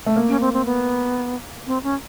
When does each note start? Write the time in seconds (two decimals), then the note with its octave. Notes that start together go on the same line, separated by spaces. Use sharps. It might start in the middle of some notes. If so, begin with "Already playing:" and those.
0.06 A3
0.16 A#3
0.28 C#4
0.41 C4
0.53 C4
0.65 B3
1.67 C4
1.83 C#4